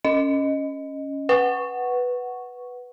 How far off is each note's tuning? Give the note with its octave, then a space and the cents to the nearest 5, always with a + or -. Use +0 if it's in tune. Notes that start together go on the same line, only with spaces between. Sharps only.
C#4 +0 D#5 +0
B4 +0 F#5 +5 C#6 +0